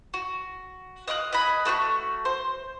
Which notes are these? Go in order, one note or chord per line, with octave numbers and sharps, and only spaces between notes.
F#4
D#5 F5 D6 F#6
D#5 F#5 G#5 B5
A3 F#4 F#5 C#6
C5